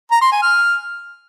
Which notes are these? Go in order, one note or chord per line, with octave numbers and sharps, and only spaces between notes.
A#5
C6
G#5
F6